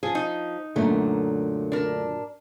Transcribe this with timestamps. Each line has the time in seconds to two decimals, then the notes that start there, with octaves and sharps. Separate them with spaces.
0.03 F3 G#4
0.15 D#4
0.76 F#2 A#2 D3 F#3 A3
1.72 D4 A#4